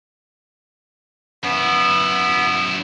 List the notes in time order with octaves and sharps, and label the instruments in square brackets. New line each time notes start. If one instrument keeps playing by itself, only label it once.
[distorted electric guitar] F#2 E4 [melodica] B3 B5